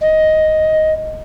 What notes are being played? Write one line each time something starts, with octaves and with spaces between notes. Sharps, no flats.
D#5